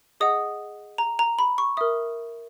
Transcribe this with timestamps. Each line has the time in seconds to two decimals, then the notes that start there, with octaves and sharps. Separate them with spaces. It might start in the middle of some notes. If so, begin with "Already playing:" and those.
0.20 G#4 D#5 F#5 D#6
0.98 A#5
1.19 A#5
1.39 B5
1.58 C#6
1.77 A#4 E5 D#6